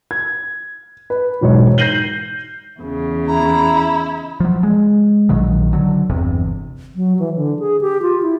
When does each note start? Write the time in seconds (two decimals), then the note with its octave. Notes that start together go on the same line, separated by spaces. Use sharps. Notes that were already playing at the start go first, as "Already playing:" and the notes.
0.11 G#6
1.10 B4
1.41 E1 B1 G#2 C#5
1.78 G6 A#6 C7 D#7 F#7 G7
2.80 E2 C#3
3.28 E4 A#5
4.40 F3 F#3
4.63 G#3
5.29 A#1 A#2 D#3 F#3
5.73 D3 F#3
6.10 G1 E2 C3
6.96 F#3
7.19 E3
7.36 D3
7.59 G#4
7.81 G4
8.02 F4
8.22 E4